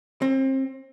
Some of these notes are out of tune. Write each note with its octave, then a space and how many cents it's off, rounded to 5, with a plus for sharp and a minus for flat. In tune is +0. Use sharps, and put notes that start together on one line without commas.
C4 +30